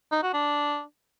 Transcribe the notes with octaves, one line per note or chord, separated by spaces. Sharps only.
D#4
F#4
D4